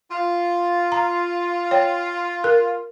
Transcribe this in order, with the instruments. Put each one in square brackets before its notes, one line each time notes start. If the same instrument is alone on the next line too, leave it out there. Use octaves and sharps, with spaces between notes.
[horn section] F4
[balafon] A#5
C#5 G5
A#4